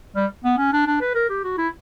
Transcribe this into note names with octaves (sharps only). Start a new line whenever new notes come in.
G3
B3
C#4
D4
D4
B4
A#4
G4
F#4
E4